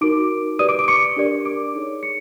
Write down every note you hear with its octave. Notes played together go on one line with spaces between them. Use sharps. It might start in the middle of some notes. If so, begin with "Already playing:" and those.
D#4 F#4 A#4 D6 D7
G4 B4 D5 D#6 D#7
D6 D7
D6 D7
C#6 C#7
D4 G4 A#4 D5
D6 D7
D#4 G#4 C#5
C#6 C#7